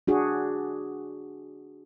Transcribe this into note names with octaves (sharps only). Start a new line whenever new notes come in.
D4 F#4 G#4